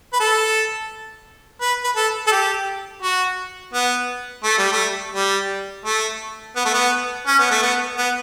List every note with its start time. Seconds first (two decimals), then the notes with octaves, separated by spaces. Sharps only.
0.13 B4
0.20 A4
1.61 B4
1.84 B4
1.96 A4
2.27 A4
2.32 G4
3.02 F#4
3.74 B3
4.44 A3
4.58 G3
4.72 A3
5.15 G3
5.85 A3
6.56 B3
6.65 A3
6.74 B3
7.27 C#4
7.39 B3
7.50 A3
7.62 B3
7.98 B3